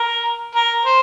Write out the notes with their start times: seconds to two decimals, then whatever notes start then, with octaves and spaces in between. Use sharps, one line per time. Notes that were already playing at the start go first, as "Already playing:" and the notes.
Already playing: A#4
0.55 A#4
0.85 C5